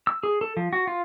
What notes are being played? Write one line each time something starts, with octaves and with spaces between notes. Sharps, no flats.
E6
G#4
A4
F3
F#4
F4